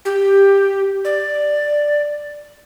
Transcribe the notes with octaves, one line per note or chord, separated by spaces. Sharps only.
G4
D5